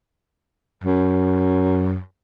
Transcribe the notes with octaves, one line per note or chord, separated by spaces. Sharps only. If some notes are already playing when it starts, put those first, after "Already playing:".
F#2